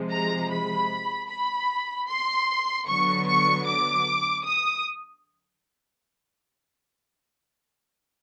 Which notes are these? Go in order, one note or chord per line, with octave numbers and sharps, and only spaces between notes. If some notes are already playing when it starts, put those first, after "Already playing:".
Already playing: C3 F3 G#3
A#5
B5
B5
C6
D3 F#3 B3 C#6
C#6
D6
D#6